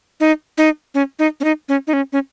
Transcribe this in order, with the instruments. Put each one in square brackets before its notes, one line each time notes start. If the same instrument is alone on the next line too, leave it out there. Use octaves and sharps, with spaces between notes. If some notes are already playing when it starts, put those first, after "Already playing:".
[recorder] D#4
D#4
C#4
D#4
C#4
D#4
C#4
D#4
C#4
C#4